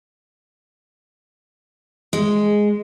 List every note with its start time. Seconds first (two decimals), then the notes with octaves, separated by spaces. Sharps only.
2.13 G#3